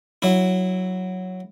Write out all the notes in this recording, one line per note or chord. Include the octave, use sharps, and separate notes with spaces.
F#3 E4